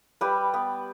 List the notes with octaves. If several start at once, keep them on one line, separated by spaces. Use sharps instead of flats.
G3 G4 B4
B3